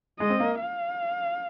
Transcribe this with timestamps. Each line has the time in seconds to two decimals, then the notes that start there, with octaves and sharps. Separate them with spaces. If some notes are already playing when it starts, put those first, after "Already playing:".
0.20 G#3 D#5
0.30 C4
0.40 A#3
0.60 F5